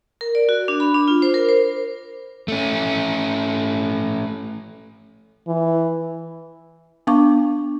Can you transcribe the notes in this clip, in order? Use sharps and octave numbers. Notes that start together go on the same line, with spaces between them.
A#4
D5
F#4
D4
B5
D4
F4
C5
A#4
C5
A3 C#4
E3
B3 D4 F5 C#6 D6